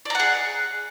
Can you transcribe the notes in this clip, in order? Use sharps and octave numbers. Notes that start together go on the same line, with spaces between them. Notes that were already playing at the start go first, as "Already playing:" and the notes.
G#4 D5 F#5 A#5